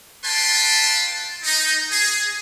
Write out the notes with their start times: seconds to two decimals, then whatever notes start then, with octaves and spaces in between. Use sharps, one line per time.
0.23 F4 B4 G5 A5 C6
1.44 D#4
1.91 G#4